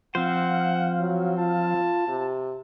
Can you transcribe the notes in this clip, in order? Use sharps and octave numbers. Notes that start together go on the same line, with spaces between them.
F3 C4 C5 F5 F#5
F#3
F4 A5
C3